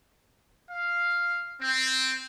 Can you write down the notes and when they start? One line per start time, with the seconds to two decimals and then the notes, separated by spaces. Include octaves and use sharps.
0.70 F5
1.61 C4